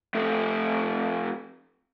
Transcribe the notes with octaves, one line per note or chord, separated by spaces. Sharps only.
F2 A3